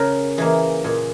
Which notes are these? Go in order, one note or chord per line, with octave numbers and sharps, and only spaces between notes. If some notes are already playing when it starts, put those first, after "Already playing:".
Already playing: C#3 A#4
E3 A#3 G#4
A#2 G#4